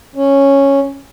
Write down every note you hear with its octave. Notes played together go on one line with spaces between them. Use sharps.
C#4